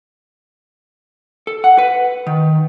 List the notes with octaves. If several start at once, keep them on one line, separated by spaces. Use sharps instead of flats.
A4
F#5
B4
D#3